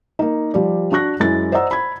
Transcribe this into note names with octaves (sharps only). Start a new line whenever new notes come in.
A#3 D#4
F3 G3 D5
D4 F#4 C#6 F#6 A#6
F#2 G#3 E4 A6
C5 D5 D#5 F#5 A#5 E6
B5 G#6